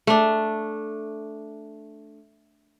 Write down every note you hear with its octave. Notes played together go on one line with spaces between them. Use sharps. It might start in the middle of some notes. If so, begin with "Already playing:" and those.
A3 D4